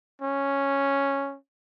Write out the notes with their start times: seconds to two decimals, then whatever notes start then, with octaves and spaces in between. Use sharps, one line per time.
0.22 C#4